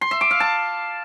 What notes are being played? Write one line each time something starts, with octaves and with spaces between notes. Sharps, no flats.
C6
E5
D6
F5
A5